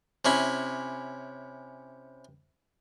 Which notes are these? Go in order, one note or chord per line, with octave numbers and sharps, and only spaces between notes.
C3 C#4 E4